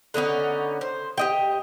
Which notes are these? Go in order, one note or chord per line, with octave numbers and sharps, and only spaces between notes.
D3 B3 C#4 D#4
C5
G4 D#5 G5